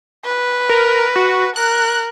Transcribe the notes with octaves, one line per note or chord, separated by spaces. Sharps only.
B4
A#4
F#4
A#4 F#6